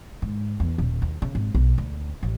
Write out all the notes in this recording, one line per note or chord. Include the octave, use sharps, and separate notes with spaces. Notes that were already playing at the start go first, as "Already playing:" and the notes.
G#2
E2
D#1
D#2
C#3
G#1
B1
D2
A1